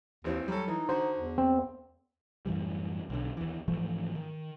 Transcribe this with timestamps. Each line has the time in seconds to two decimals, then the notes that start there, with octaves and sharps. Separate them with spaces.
0.24 G#1 D#2 E3 C4
0.48 F#3 G3 A4
0.68 E3 D#4
0.89 D3 F#4 C5
1.17 E2
1.38 C4
2.46 F#2 A2 E3 G3
3.10 B1 D3
3.37 D#2 E3
3.68 G#2 E3 F3 A3
4.15 D#3